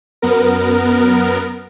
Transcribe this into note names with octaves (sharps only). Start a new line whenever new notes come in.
F#2 B3 A#4